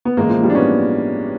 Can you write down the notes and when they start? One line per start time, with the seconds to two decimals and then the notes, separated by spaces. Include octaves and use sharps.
0.05 B3
0.17 A1 A2 E3 G#3 A#3
0.29 F3
0.43 F3 G3
0.50 D4
0.55 B3 C#4